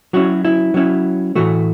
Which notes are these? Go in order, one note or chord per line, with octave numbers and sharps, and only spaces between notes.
F#3 C#4 E4 F#4
E4
F#3 C#4 E4
A2 E3 A3 F#4